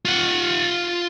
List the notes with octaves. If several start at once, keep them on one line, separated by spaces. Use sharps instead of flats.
F4 F#5